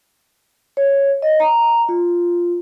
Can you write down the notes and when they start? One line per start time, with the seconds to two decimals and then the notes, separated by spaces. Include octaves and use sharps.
0.77 C#5
1.22 D#5
1.40 A#5
1.89 F4